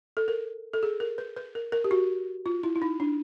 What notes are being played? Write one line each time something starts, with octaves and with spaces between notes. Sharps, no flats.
A4
A#4
A4
G#4
A#4
B4
B4
A#4
A#4
G4
F#4
F4
E4
E4
D#4
D4